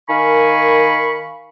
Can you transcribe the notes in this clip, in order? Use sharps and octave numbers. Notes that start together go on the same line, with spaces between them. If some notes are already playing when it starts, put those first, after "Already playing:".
D#3 A#4 F5 G#5 B5 C#6